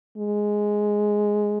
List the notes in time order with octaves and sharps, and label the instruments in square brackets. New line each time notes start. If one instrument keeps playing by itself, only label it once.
[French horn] G#3